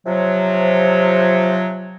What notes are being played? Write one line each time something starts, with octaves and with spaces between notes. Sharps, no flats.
C3 F3 F#3